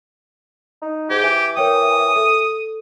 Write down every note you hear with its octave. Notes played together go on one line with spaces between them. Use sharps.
D#4
G#2 G4 G#6
E3
A#4 C#5 G5 D#6
A4